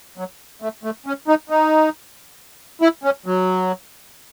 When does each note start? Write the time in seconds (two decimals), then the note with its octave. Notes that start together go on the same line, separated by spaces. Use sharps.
0.18 F#3
0.62 A3
0.84 A3
1.06 C#4
1.28 D#4
1.50 D#4
2.82 E4
3.04 C#4
3.26 F#3